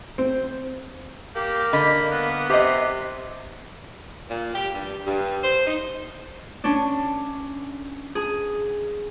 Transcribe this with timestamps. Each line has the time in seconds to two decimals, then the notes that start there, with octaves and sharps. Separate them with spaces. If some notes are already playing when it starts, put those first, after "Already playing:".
0.18 C4
1.35 A#3 G4
1.73 D3 D#5 B5
2.10 B3
2.50 C3 G4 D#5
4.30 A#2
4.54 G4
4.74 G2
5.07 G2
5.43 C5
5.67 D#4
6.64 C#4 D4
8.15 G#4